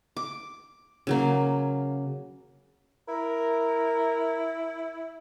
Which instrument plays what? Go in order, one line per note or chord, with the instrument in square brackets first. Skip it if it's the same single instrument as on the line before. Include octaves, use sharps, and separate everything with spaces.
[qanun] D6
C#3 F#3 A#3
[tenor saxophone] E4 [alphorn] A#4